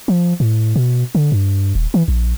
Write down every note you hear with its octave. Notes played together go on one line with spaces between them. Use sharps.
F3
A2
B2
D3
G2
D#1
E3
A#1